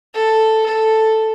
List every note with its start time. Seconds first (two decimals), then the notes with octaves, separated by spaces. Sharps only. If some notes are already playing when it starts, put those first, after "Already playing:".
0.14 A4
0.66 A4